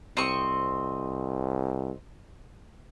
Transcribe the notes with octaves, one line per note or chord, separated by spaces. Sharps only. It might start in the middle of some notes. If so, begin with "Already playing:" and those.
C2 C4 D#5 C#6